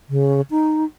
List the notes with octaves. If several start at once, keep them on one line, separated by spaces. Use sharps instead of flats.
C#3
D#4